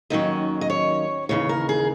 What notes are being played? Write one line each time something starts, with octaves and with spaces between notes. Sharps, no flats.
D#2 D#3 F#3 C#4 D#5
D#5
C#5
D#2 C#3 E3 C#5
A#4
G#4